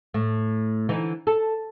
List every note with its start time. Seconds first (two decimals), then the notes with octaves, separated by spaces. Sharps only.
0.14 A2
0.89 D3 E3 D#4
1.27 A4